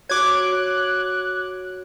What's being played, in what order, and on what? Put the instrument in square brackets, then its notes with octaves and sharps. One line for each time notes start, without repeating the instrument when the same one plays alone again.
[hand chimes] F#4 C#5 [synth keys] D6 G#6 [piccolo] F#6